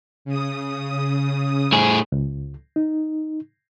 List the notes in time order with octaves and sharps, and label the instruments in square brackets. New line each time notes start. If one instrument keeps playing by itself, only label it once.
[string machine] C#3 D#6
[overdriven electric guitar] A2 G#4
[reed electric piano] C#2
D#4